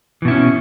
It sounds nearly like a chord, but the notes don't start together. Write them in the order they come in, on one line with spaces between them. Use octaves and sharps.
E3 B2 E4 C#4